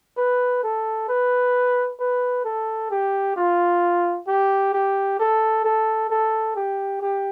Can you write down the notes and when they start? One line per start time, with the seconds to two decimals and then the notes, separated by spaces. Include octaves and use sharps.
0.17 B4
0.63 A4
1.09 B4
2.00 B4
2.45 A4
2.91 G4
3.36 F4
4.28 G4
4.74 G4
5.20 A4
5.65 A4
6.10 A4
6.56 G4
7.01 G4